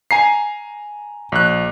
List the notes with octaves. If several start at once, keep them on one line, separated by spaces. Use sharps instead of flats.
G#5 A#5 C7
A#1 F#6